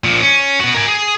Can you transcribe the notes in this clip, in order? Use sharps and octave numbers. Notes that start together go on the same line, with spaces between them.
A#2 F3
C#4
B3 F#4
A#4 G#5
G#4